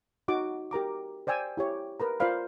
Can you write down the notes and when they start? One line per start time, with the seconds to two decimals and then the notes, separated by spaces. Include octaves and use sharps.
0.28 D#4 F#4 D6
0.71 G4 A#4 A#5 D6
1.27 C5 D5 G5 G#5 E6
1.57 E4 G4 C#5
2.00 A#4 B4 A#5
2.20 F4 A#4 C5 D5 F5 B5